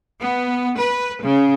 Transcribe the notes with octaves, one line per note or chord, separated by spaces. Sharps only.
B3
B4
C#3